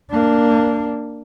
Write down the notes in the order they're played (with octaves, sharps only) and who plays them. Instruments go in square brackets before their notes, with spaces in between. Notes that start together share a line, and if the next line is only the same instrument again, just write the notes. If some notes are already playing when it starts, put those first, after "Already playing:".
[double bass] A#3 D4